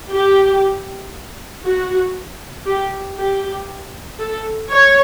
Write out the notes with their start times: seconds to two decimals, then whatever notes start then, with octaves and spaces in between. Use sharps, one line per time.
0.12 G4
1.65 F#4
2.67 G4
3.18 G4
4.20 A4
4.71 C#5